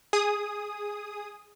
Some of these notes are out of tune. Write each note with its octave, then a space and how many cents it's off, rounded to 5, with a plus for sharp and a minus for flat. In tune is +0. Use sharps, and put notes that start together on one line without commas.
G#4 -5 D#6 +0